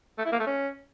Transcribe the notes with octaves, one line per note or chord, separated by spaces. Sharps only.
A3
E4
A#3
A3
C#4